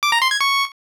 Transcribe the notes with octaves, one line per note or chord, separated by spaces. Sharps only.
D6
A#5
C6
G#6
C#6